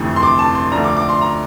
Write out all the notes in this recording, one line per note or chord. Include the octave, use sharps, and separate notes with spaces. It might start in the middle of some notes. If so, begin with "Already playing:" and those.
Already playing: G1 F2 C3 E3 A3
C6
D6
A5
C6
D2 D3 F3 A3 D4 A#5
D6
D6
C6
A#5